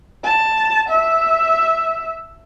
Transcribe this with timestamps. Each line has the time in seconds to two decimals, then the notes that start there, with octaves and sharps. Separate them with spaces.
0.24 A5
0.89 E5